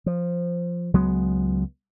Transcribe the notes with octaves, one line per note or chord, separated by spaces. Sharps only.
F3
C#2 F#3 G#3 B3